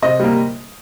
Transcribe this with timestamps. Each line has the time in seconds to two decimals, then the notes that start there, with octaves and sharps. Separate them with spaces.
0.02 C3 D#5
0.20 G3 A#3